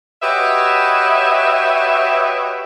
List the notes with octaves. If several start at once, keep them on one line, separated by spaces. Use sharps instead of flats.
F#4 G4 B4 C#5 D#5 E5